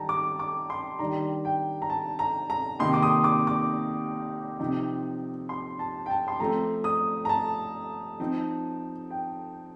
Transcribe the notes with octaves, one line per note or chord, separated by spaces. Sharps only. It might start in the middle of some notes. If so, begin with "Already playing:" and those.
Already playing: D#3 G3 A5 A#5
D6
D6
C6
D#3 G3 D4 A#5
G5
A#5
A5
A#5
A#5
C3 D#3 A#3 D#4 C6
D6
D#6
D6
D6
C3 F3 C4 D#4
C6
A5
G5
A5
C6
F3 A3 C4 A#5
D#6
A#5
A5
F3 C4 D#4
G5